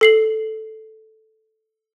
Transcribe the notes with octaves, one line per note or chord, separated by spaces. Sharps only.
A4 C7 F#7